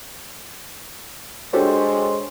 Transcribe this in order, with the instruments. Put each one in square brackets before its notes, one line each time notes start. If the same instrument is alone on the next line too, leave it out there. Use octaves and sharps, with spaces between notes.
[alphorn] G#3 [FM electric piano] D4 C#5 [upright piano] F#4 G4 A4 [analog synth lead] C5